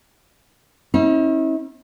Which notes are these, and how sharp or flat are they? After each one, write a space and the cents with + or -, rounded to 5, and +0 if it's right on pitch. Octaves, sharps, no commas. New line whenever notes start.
C#4 -35 E4 -45